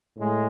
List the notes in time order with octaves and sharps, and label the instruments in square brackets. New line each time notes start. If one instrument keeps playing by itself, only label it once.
[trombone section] A2 G#3